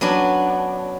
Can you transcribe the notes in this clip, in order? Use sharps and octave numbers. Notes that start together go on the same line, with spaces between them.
F#3 B3 C#4 D4